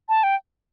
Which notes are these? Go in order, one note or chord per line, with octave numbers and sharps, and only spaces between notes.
A5
G5